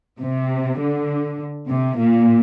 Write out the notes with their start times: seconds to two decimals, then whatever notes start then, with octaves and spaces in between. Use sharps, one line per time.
0.19 C3
0.79 D3
1.68 C3
1.98 A#2